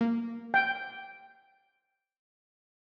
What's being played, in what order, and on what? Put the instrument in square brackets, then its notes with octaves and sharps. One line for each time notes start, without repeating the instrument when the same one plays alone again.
[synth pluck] A#3
[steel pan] G5